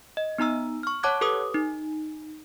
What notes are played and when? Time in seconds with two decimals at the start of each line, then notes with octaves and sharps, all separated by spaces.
0.17 D#5
0.38 B3 D#4 A#5 E6
0.83 C#6 F6
1.03 C#5 F#5 A5 D6 F#6 G#6
1.21 G4 A4 B4 D6 D#6
1.54 D#4